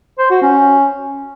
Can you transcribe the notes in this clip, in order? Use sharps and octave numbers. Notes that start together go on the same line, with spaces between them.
C5
F#4
C#4